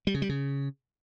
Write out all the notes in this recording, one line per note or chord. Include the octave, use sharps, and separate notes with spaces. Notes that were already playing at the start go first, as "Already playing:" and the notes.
G3
C#3
G3
C#3